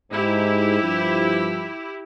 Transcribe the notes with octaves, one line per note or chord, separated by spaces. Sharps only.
G#2 E4 G4
G2 F3